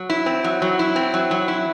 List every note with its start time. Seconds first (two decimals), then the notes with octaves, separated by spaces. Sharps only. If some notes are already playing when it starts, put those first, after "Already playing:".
Already playing: F#3
0.10 E4
0.26 C4
0.44 F#3
0.62 F#3
0.79 E4
0.96 C4
1.14 F#3
1.31 F#3
1.48 E4